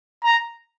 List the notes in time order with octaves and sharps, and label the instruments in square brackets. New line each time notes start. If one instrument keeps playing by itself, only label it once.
[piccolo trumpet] A#5